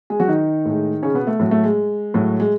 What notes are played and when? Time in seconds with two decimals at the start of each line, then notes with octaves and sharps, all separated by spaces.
0.10 G#3 G#4
0.20 F#3 F#4
0.28 D#3 D#4
0.65 A2 G#3
1.03 C#3 C#4
1.14 B2 B3
1.27 A3
1.40 A2 F#3
1.51 A3
1.64 G#3
2.14 A2 F#3
2.40 G#3